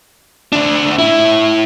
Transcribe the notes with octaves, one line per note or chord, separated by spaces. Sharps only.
D2 D4
A2 E4